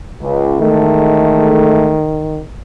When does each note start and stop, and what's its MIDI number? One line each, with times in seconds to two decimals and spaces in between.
0.22 0.58 37
0.60 1.97 40
0.60 2.42 51
0.60 1.97 56
0.60 1.97 57